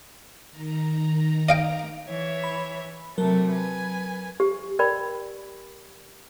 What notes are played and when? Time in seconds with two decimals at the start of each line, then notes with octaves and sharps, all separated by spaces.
0.51 D#3 A#5
1.49 D#5 F5 G5
2.08 E3 C#5 E5
2.44 B5
3.18 C3 F#3 A3 A#4
3.51 B4 G#5
4.40 G4
4.79 A#4 D5 G5 B5